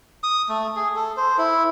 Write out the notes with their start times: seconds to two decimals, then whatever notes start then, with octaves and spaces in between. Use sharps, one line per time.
0.23 D#6
0.49 A3
0.76 G#4
0.96 A4
1.17 C5
1.38 E4